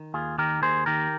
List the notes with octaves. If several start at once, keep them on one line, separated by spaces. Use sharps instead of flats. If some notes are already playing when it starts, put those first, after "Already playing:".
Already playing: D#3
D#2 F4 G#4
D#3 G4 A#4
D#2 G#4 C5
D#3 G4 A#4